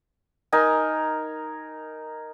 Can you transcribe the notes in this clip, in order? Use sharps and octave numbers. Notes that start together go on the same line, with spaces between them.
D#4 A#4 G#5